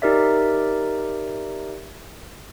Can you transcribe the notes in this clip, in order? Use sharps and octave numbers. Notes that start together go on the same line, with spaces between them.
D#4 G4 A#4 D5 E5